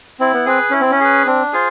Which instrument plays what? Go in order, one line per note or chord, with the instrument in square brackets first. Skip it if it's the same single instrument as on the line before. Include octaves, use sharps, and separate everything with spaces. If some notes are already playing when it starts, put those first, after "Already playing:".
[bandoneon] C4 [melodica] E4
[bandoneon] B3
[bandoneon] C4 [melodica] G#4 B4
[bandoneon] C#4 [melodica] E4
[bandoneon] C4
C#4
[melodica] G#4 B4
[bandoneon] C4 [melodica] D4
[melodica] F4 G#4 C5